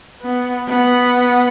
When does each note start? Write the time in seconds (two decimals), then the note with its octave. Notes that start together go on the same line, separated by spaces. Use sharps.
0.22 B3
0.69 B3